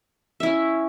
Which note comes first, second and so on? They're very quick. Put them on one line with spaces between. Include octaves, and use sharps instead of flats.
E5 E4 C#4